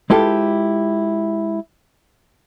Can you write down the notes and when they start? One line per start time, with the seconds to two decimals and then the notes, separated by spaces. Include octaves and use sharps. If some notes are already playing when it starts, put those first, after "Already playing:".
0.10 G#3 E4 F4 G4 A4 B4